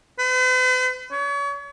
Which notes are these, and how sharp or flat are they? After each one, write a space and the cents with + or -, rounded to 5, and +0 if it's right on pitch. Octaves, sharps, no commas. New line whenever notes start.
B4 +45
C#5 +35